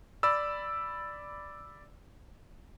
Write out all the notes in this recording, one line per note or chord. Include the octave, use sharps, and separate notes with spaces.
D5 B5 E6